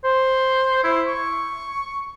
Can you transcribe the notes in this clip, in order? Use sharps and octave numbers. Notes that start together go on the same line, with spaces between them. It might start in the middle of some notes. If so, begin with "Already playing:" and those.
C5
E4
C#6